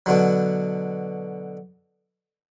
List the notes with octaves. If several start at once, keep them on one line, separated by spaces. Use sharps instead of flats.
B2 D3 F#3